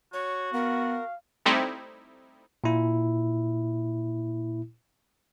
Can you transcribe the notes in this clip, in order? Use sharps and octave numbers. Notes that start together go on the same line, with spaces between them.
F#4 C#5
B3 A#4 F5
G3 A3 C4 D#4 E4
A#2 E4